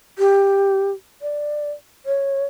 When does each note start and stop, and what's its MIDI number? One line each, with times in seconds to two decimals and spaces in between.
0.19 0.91 67
1.22 1.72 74
2.06 2.46 73